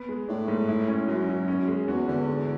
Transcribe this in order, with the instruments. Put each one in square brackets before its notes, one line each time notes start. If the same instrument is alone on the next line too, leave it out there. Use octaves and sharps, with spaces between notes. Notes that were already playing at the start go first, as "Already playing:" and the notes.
Already playing: [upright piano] B3
G#3
[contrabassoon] A2 [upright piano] D4
[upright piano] G#2
E4
C#4
[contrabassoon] F#2 [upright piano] F#3
[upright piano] F#3
C#4
G#3
[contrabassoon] E2 [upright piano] F#4
[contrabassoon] E2 [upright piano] D3
[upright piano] G#3